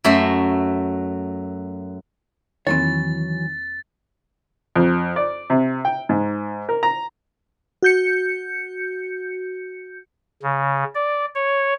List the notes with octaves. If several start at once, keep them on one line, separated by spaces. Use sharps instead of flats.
F#2 F#3 A3 E5 C6
E2 D#3 E3 F#3 A#3 C4 C#5 A6
F2
D5
C3
G5
G#2
A#4
A#5
F#4 G6 C#7
C#3
D5
C#5